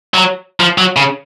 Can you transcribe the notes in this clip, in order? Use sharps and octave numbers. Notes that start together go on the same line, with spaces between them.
F#3
F3
F#3
C#3